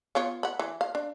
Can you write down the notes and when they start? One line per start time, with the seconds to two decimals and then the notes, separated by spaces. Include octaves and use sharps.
0.15 B3 F4 C#5
0.43 F#5 B5
0.59 E3
0.81 F5
0.95 D4